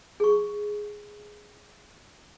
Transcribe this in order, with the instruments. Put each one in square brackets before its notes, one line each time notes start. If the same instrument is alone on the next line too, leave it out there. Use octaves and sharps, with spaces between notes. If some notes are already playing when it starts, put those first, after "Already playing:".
[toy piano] G#4 C#6